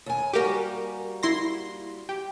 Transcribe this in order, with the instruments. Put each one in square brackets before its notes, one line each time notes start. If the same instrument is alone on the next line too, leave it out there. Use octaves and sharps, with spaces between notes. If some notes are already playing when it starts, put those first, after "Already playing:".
[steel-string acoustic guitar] D#2 G#5
[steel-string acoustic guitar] G3 A#3 F#4 [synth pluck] G4 A#4
[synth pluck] E4 C6 A#6
G4